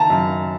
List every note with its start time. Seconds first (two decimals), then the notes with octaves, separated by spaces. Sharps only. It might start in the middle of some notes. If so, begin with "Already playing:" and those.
Already playing: D#3 A5 A#5
0.10 F#2